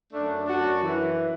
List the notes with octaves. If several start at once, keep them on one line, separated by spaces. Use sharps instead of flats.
F#2 A3 D4
F#2 D4 F#4
E3